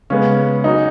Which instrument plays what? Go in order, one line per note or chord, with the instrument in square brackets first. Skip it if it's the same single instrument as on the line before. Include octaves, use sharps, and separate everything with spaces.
[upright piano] C#3 G#3 B3 [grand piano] C#4
[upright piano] F#3 C#4 F#4 [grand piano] D#4